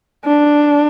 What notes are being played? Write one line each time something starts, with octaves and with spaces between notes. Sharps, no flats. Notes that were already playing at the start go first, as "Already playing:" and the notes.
D4